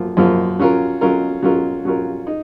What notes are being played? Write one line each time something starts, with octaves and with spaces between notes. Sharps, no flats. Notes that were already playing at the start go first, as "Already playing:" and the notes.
Already playing: F#2 F3 A#3 F4
F#2 F3 A#3 F4
F#3 C#4 F4 A#4
F#3 C#4 F4 A#4
F#3 C#4 F4 A#4
F#3 C#4 F4 A#4
D#4